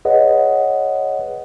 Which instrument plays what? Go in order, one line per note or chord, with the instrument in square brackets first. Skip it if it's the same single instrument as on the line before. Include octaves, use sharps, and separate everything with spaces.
[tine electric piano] G#4 B4 C#5 D#5 F#5